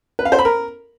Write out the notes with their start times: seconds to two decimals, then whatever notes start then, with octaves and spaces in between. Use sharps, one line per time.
0.19 B4
0.25 F5
0.32 C5
0.38 B5
0.45 A#4